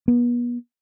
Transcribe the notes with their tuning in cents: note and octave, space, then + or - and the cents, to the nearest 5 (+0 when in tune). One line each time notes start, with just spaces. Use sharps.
B3 -35